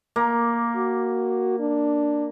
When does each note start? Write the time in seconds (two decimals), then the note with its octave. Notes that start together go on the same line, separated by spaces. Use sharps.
0.16 A#3
0.76 F#4
1.60 D4